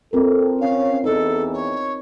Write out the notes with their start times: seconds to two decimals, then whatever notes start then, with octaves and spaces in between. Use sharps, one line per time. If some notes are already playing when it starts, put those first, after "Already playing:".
0.13 C4 F4 A4 A#4
0.60 C#4 F5
1.04 E2 D#4 A4
1.53 C#5